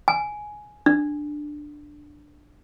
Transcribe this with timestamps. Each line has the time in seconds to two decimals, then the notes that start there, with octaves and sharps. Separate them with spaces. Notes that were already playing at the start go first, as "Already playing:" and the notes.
0.08 G#5
0.86 D4